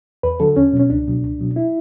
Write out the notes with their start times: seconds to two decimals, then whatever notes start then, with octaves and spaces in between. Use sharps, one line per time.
0.23 E2 B4
0.40 D3 F#3 A4
0.56 E2 C#4
0.73 B2 F#3
0.79 C#4
0.90 C#2 D4
1.06 B2 F#3
1.22 C#2
1.39 B2 F#3
1.56 E4